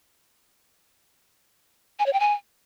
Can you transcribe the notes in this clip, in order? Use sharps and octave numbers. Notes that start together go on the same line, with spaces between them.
G#5
C#5
G5
G#5